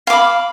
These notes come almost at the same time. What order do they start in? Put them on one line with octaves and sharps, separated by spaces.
F5 D6 B5